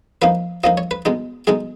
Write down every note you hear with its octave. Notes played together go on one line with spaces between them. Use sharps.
F3 A#3 D#4 B4
F3 A#3 D#4 D#5
C#5
B4
B2 G#3 D#4
B2 G#3 D#4 G#4